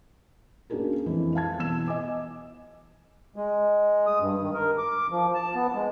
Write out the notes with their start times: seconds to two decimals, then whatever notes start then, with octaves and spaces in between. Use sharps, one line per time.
0.70 A#3 C#4 D4 F#4 G#4 A#4
1.06 F2 E3 F3 G#3
1.35 F5 A5 G#6
1.59 B2 E3 E6 E7
1.88 D#5 G#5 D6
3.36 G#3
4.07 D#6
4.20 G2
4.42 D#3
4.54 A#4
4.78 D6
5.10 F3
5.34 A5
5.55 B3
5.75 G#3